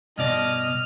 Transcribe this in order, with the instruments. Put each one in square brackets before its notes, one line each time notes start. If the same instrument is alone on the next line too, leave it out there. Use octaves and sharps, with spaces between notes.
[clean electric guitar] G2 B2 D5 [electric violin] D#5 [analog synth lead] F6